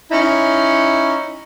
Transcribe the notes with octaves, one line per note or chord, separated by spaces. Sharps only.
C#4 D#4 E4